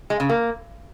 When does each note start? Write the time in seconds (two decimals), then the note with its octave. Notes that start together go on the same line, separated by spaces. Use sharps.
0.10 G#3
0.20 C#3
0.29 A#3